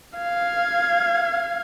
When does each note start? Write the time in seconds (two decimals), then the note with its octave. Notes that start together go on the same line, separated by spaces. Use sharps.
0.19 F5 G#6